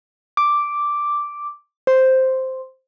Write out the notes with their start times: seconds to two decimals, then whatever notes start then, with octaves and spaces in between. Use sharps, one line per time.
0.37 D6
1.87 C5